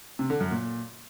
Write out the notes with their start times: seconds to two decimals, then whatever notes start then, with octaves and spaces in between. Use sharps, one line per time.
0.19 C3
0.30 D3
0.40 F#2
0.51 A#2